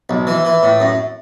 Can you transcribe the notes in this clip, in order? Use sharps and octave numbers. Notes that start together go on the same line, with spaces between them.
B1
E3
E3
A2
F#2